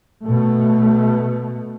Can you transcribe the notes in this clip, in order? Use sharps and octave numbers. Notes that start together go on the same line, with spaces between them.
B2 A3